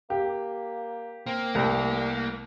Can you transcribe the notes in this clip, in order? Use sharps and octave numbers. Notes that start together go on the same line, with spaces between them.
A#3 G4
A#3 C4
C2 G3 A3